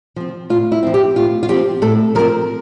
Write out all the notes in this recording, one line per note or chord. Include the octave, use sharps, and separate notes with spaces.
F3 C4
A2 F4
E4
F3 C4
G4
A2 F4
F4
F3 C4 G4
A2 A4
F3 C4 A#4